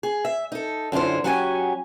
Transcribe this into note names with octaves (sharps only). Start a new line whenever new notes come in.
G#4
E5
D#4 A4
F#2 D3 E4 F4 C5
F#3 C#4 F#4 G4 D#5 G#5